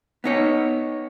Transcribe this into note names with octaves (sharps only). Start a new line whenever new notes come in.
B3 D#4 C#5